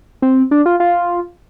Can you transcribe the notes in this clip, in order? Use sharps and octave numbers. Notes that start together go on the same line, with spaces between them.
C4
D4
F4
F4